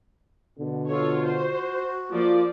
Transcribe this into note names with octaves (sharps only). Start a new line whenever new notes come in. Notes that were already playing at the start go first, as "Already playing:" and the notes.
B2 D3
F4 A4 C#5
F#4 C5
F3 A#3 F4 D5